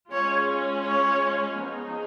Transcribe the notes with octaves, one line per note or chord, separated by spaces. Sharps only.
G#3 C#4 F4 C#5
C#5
F3 B3 D#4 G#4